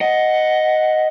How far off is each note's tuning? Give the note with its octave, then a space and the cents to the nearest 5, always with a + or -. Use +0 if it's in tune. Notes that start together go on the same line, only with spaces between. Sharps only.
D#5 +0 F#5 +0